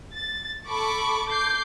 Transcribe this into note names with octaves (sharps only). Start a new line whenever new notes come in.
A6
A4 A5 B5 C#6 D6
D6 G6 C7